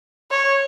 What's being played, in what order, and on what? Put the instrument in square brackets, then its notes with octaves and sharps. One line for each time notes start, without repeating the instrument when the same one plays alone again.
[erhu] C#5